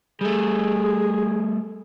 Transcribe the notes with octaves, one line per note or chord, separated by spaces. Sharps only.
G3 A3 G#4